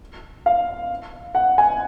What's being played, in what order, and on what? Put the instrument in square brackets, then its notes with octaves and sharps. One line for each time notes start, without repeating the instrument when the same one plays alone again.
[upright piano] F5
F#5
G#5